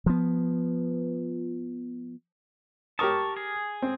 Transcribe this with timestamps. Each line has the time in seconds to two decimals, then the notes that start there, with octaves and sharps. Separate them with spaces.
0.06 F3 B3
2.99 G4 A#4 A5 C#6 D#6
3.37 G#4
3.82 C4